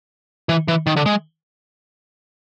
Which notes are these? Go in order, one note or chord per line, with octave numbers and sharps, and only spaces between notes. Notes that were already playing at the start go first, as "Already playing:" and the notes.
E3
E3
D#3
D3
G#3